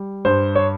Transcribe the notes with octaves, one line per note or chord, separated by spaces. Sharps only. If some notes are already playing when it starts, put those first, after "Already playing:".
Already playing: G3
G2 C5
C#5